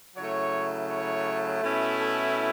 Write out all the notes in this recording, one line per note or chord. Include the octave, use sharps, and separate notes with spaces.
C#3 F#3 A3 E4 C#5
C#5
B2 A3 C#4 E4
A4